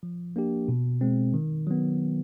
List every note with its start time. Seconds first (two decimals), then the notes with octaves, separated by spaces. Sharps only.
0.03 F3
0.36 A#3 D4 G4
0.68 B2
1.01 G#3 C4
1.34 D#3
1.67 F#3 B3